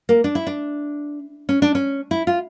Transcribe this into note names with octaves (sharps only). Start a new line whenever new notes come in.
A#3
D4
E4
D4
C#4
D4
C#4
E4
F4